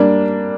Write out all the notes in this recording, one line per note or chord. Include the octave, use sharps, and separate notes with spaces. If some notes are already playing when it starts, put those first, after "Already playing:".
Already playing: G3 A#3 D4